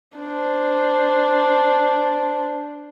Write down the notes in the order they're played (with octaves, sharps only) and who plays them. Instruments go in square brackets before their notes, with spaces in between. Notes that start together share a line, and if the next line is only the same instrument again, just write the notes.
[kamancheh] D4 C5